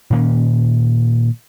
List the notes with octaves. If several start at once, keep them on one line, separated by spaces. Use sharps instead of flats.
A#2 D#3 A#3 C#4